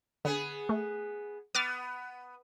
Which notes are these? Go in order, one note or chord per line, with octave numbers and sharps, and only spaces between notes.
D3 B3 G#4
A3
B3 D6 F6 A6